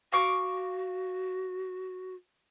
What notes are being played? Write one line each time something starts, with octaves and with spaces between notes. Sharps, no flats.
F#4 F5 C#6 D6